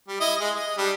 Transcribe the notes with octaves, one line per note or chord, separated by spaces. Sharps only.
G3
E4 D#5
G#3
D#5
G3 D4